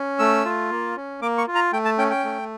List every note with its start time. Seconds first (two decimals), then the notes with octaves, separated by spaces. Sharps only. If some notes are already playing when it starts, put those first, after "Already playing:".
Already playing: C#4
0.19 A3 E6
0.45 F4
0.71 A#3
0.96 C#4
1.22 A#3 D6
1.38 C#6
1.48 F4
1.55 A#5
1.73 A3 G5
1.85 A5
1.98 C#4 G5
2.10 G5
2.24 A3